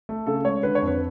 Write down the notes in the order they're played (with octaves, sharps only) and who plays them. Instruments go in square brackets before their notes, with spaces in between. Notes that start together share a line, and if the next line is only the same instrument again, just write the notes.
[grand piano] A3
C#3 A4
G#3 C#5
D3 B4
C#5
F2
B4